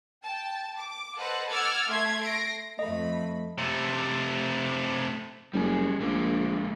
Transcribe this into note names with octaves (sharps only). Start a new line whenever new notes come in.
G5 A5
D6
A4 B4 C5 D#5 F#5
F#5 D6 E6 F6 G#6 A6
A3 C6 G#6
A#6 C7 D7
F2 A3 D#5 B5
C3 A3
F#1 G3 G#4
A#1 D3 G#3 A#3